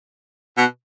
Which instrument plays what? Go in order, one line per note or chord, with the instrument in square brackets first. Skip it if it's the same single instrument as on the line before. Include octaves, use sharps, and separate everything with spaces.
[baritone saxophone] B2